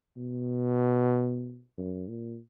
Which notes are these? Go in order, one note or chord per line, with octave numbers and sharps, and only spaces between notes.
B2
F#2
A#2